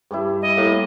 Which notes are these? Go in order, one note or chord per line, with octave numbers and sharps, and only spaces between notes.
G2 G3 E4
D#5
A2 A#3